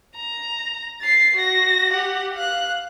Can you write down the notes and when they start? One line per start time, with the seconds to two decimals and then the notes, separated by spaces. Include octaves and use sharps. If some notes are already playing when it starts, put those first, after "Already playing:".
0.15 A#5
1.01 A6 C7
1.36 F#4 A#6
1.92 G4 F#5
2.34 F5 F#6